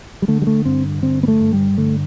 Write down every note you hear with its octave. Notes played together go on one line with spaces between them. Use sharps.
G3
D3 A3
G3
A3
G2 C4
D3 C4
B3
A3
G2
G3
D3 A3